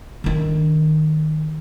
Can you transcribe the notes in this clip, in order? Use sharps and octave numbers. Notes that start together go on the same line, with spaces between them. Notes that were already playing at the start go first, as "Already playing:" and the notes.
D3 D#3